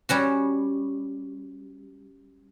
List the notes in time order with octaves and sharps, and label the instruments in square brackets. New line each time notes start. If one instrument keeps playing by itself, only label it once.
[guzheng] G3 C#4 F#4